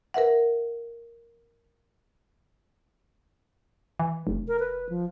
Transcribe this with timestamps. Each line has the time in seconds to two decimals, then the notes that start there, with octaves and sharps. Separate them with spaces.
0.14 A#4 B4 E5 F#5
4.00 E3
4.27 F1
4.48 A#4
4.60 B4
4.89 F3